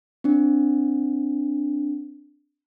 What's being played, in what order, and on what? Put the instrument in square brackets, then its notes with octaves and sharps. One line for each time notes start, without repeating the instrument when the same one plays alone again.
[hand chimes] C4 D4